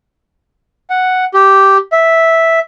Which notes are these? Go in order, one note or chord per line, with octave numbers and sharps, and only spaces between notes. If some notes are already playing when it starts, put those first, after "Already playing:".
F#5
G4
E5